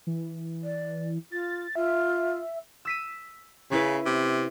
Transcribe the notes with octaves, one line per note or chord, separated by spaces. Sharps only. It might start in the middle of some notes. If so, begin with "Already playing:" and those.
E3
D5
F4 A6
F4 E5
E6 B6 D#7
C#3 C#4 E4 B4
C3